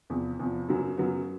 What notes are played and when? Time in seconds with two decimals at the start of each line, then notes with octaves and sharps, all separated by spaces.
0.10 E2 C3 F3
0.39 E2 C3 F3
0.68 F#2 C#3 F#3 B3
0.97 F#2 C#3 F#3 B3